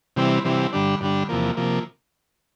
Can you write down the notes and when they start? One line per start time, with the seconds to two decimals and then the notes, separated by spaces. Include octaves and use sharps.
0.16 C3 E3 G3 C4
0.45 C3 E3 G3 C4
0.73 G2 D3 G3 D4
1.01 G2 D3 G3 D4
1.29 E2 C3 F3 A#3
1.57 C3 F3 A#3